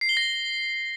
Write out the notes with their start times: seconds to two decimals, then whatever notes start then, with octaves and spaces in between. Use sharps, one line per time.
0.01 C7
0.09 G7
0.17 A#6